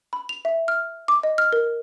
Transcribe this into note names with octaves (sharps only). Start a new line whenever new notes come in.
B5
F7
E5
F6
D6
D#5
F6
A#4